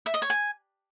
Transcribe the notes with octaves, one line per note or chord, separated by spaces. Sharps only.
E5
D#5
C#5
G#5